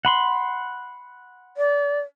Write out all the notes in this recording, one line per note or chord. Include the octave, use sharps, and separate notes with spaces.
F#5 B5 C6
D5